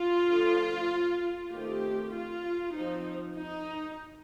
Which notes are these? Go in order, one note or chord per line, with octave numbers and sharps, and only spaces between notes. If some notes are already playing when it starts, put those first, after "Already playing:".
Already playing: F4
D3 F3 A3
D#3 A3 C4 G4
F4
F3 C4 D#4
D#4